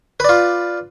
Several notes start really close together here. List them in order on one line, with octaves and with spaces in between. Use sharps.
B4 D5 F4